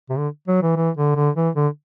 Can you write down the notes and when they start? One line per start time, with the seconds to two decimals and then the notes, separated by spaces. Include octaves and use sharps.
0.10 C3
0.18 D3
0.48 F#3
0.63 E3
0.77 E3
0.97 D3
1.16 D3
1.36 E3
1.56 D3